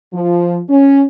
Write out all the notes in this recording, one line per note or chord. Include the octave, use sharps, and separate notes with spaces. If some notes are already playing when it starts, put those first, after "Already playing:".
F3
C#4